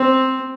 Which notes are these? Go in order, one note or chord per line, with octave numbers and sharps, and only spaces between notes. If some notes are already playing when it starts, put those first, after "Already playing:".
Already playing: C4